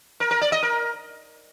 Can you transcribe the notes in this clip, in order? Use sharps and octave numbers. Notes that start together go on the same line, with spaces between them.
A#4
A#4
D5
D#5
A#4